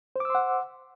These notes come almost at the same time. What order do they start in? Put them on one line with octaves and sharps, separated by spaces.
C5 D6 E6 C6 F#5